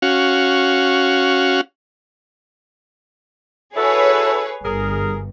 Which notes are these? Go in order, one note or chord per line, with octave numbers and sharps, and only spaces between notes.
C#4 F#4 F5
E4 F#4 G#4 A4 B4 C#5
G1 G2 G#4 A#4